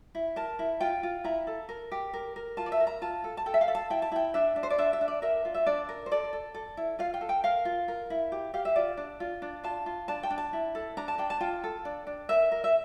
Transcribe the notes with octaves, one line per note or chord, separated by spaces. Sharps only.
E4
A#4 A5
E4
F4 G5
F4
E4 A#5
A4
A#4
G4
A#4
A#4
F4 A5
D5
E5
A#4
A#5
F4 A5
A4
A5
A4 G5
E5
F5
A4
A5
E4 G5
A5
E4 G5
D4 E5
D4
C5
D5
D4 E5
E5
D4
D5
A#4 E5
F4
E5
D4 D5
A#4
C5
A4 D5
A4
A4
E4
F4 F5
G5
A4
G5
A#4 F5
F4
A#4
E4
G4
G4 F5
E5
F4 D5
D4
F4
D4
F4 A5
F4
D4 A5
G5
D4
A5
E4
A4
D4 A#5
A5
D4 G5
A5
F4 G5
A4
D4
D4
A#4 E5
A#4
E5